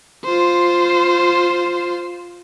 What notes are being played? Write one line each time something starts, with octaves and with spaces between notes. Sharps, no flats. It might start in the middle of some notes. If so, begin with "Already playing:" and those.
F4 C5